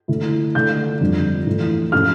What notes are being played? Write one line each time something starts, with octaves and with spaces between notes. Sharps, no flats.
D3 A3 E4
D3 A3 D4 G6
F2 D3 G3 D4
A2 E3 A3
A2 F3 C#4 E4 F6